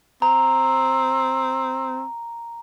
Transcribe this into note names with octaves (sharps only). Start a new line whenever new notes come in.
C4 A#5